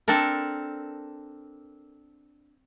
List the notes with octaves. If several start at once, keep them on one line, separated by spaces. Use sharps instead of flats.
C4 D4 A4 A#4